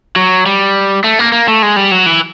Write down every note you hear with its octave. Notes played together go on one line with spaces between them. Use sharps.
F#3
G3
A3
A#3
A#3
A3
G#3
G3
F#3
E3